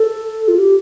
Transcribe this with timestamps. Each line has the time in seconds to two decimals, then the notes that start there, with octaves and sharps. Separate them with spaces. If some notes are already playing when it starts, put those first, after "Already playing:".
Already playing: A4
0.48 F4
0.59 G4